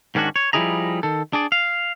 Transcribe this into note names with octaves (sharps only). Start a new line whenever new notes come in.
G#2 D#3 C#4 D4 F#4
C#5
F3 G3 E4 G#4 D#5 A#5
D#3 A4
D4 G#4 D5
F5